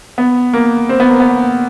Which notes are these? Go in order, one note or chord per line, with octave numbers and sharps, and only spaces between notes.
B3
A#3
C4
B3
A#3
B3